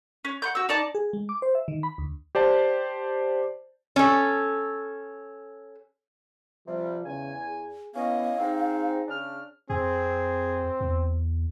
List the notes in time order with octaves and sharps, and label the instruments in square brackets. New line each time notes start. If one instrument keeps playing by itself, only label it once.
[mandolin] C#4
F#5 C6 G6
F#4 E6
D#4 D5 A5 D6
[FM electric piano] G#4
G#3
D6
C5
E5
D#3
B5
D2
[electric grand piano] G4 C5 D5 A5
[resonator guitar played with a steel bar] C#4 A4
[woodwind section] C3 G3 [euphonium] F3
[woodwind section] E2 G#5 [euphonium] C#3
[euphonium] G#4
[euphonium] B3 [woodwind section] C#4 E4 D#5 [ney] F5
[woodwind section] C4 D#4 [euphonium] G#4
[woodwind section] C#3 D4 F6
[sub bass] F2 [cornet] C4 [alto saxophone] G#4
[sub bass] E2